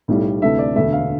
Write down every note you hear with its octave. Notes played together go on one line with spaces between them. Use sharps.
B1 A2 G3
D2 C3 E3 A3 E5
D5
E1 D2 D3 A3 E5
F5